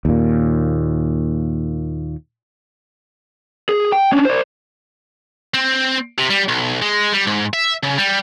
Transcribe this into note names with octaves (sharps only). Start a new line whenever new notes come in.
D#2 A#2
G#4
G5
C#4 D4
C5 D5
C4
C3
G3
B1
G#3
G3
G#2
E5
C#3
G3